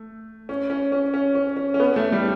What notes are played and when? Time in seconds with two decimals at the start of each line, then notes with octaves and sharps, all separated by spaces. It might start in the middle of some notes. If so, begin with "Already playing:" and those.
Already playing: A3
0.49 C#4
0.70 C#4
0.92 C#4
1.14 C#4
1.35 C#4
1.57 C#4
1.74 C#4
1.80 B3
1.96 A3
2.12 G3